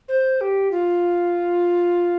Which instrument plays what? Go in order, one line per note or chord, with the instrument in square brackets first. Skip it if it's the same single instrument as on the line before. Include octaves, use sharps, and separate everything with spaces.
[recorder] C5
G4
F4